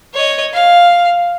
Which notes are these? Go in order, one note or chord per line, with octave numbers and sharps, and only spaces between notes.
C#5 D#5
F5